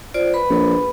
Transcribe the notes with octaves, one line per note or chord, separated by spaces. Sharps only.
F4 C5 D5
B4 B5
A#1